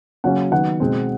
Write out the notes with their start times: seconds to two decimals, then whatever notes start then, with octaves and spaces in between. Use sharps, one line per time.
0.24 C#3 F#3 A#3 C#4 F#5
0.52 D#3 F#3 B3 F#5
0.80 B2 G#3 C4